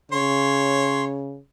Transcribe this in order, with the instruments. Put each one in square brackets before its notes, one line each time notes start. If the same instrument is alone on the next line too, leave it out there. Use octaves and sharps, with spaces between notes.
[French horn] C#3 [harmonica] C#5 [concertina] C6